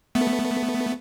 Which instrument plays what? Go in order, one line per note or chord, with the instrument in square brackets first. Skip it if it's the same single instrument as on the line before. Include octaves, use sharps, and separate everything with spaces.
[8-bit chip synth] A3 B3